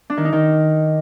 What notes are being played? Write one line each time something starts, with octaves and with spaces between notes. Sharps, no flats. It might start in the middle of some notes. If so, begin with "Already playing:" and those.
D4
D#3
D#4
D#3